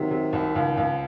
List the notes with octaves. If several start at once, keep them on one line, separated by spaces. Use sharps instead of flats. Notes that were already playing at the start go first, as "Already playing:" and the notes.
Already playing: C3 D#3 F#3
C3
C2
C#2
C#2